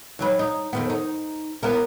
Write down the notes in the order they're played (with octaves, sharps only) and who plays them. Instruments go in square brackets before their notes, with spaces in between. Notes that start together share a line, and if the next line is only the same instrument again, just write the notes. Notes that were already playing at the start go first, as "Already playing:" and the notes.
[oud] D#2 F#3 B4
D#4
F2 D#3 B3
D#4
B3 E4 A#4